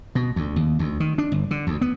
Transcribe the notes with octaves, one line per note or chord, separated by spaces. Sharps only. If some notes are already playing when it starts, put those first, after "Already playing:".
B2
D2
D#2
D2
D#3
D4
G1
D3
D2
B3